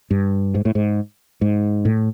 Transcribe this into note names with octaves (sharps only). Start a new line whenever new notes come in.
G2
G#2
A2
G#2
G#2
A2